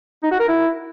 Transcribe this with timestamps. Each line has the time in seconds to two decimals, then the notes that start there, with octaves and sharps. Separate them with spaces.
0.23 D#4
0.31 F#4
0.40 A#4
0.48 E4